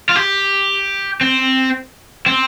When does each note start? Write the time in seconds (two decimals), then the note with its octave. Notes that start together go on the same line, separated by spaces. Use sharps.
0.09 F4
0.16 G4
1.21 C4
2.26 C4